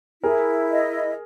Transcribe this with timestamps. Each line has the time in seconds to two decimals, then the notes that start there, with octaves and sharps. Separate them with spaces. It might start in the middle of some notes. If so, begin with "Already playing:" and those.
0.23 E4 G#4 A#4
0.70 D#5